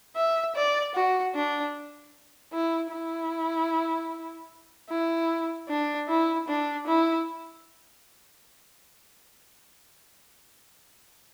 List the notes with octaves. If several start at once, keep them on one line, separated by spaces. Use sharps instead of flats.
E5
D5
F#4
D4
E4
E4
E4
D4
E4
D4
E4